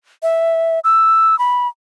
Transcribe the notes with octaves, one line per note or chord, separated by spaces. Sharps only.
E5
E6
B5